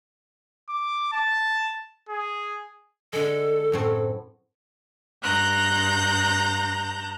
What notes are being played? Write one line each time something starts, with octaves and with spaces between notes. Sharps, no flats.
D6
A5
G#4
D3 G#3 A4
F#2 A2 C4
G2 A#5 F#6 G6 A#6